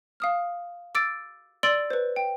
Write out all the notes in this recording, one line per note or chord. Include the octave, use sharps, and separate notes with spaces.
F5 D#6 F6
D6 E6 A6 D7
D5 C6 E6 A6 D7 F#7
B4 C5
G5